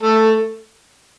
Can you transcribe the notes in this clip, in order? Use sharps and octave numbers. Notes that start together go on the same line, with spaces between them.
A3 A4